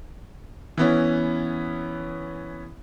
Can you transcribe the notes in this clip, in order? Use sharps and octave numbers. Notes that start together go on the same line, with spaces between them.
E3 B3 C#4